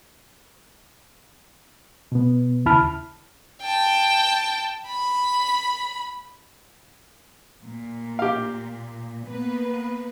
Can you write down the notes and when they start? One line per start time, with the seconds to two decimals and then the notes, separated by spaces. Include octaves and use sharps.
2.12 B2 B3
2.66 D#2 C#3 E4 A5 B5 F6
3.62 G5 A5
4.88 B5
7.63 A#2
8.19 G4 F5
9.28 A#3 B3 B4